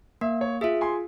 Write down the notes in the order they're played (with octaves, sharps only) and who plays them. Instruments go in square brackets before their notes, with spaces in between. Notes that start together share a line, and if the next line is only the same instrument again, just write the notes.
[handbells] A#3 [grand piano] E5
[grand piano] C#5
[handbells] F4 G#4 [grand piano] E5
[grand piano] G#5 C6